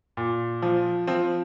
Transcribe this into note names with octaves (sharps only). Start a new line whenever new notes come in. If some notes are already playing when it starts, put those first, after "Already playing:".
A#2
F3
F3 C4